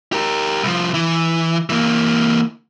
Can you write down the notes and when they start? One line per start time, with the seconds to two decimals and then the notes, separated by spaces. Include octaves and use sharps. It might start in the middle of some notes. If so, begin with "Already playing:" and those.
0.13 G4 A#4
0.63 C2 F3
0.94 E3
1.70 E3 A#3